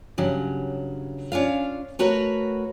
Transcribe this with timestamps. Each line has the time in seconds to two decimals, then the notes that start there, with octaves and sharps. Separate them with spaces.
0.18 G2 C#3 F#3
1.32 C#4 D4 F4 F5
1.99 A3 F#4 A#4 B4 C#5 F#5